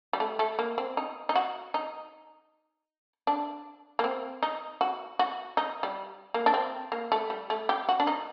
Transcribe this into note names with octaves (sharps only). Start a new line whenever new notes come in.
G3
A3
A3
A#3
C4
D#4
D#4
F#4
D#4
D4
A#3
C4
D#4
F#4
F#4
D#4
G3
A#3
D4
C4
A#3
A3
G3
A3
G4
F#4
D4
D#4